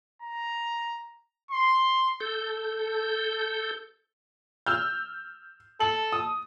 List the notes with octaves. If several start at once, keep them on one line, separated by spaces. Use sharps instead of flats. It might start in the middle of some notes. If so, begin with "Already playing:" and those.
A#5
C6
A4 G6
E6 F6 G6
A4 F#7
D#6